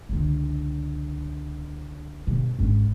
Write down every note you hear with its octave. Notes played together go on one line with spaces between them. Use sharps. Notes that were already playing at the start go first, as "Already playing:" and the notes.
C#2 D3
G2 B2
G#1 C#4